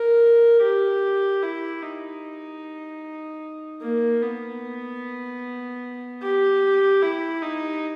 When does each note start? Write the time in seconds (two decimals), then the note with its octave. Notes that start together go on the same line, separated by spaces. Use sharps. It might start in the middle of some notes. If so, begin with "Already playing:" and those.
Already playing: A#4
0.62 G4
1.42 E4
1.82 D#4
3.82 A#3
4.22 B3
6.23 G4
7.02 E4
7.42 D#4